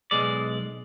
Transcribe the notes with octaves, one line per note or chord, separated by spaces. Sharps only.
B1 G#3 D5